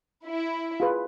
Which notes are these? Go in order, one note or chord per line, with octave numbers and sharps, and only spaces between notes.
E4
F4 G#4 B4